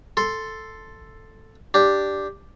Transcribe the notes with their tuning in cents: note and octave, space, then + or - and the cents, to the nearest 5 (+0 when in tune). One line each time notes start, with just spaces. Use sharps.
A4 +0 C6 +0
D4 +0 G4 +0